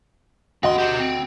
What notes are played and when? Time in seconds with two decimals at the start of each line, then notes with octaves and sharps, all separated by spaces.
0.63 D2 C4 D#5 F#5 C6
0.78 G4 E5
0.99 C4